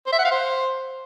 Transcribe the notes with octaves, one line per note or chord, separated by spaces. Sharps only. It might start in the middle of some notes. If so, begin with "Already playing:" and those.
C5
E5
F#5
F5
C5